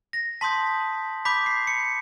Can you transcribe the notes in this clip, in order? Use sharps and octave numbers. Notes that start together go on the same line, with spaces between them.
A#6
A5 C6 D#6 G6 B6
B5 D6 G6 B6
C7
C#7